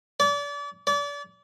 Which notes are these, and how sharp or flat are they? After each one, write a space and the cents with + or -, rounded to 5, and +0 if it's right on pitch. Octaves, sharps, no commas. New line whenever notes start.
D5 -35
D5 -35